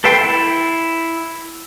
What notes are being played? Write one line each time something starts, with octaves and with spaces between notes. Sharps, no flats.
A4 B4 E5 G5 C6
E4